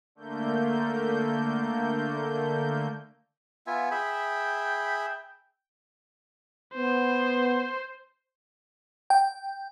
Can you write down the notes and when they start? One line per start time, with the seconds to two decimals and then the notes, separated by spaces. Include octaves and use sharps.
0.15 D3 A3 A#3 G6
3.67 B3 F4 E5 G#5
3.91 G#4 E5 G5 B5
6.75 B3 C5
9.10 G5